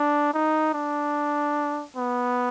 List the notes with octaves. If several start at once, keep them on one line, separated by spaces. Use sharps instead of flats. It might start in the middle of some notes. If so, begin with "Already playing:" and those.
Already playing: D4
D#4
D4
B3